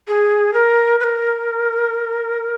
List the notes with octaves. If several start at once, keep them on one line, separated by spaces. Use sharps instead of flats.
G#4
A#4
B4
A#4